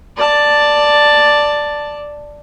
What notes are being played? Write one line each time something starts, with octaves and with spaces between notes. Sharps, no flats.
D5 A5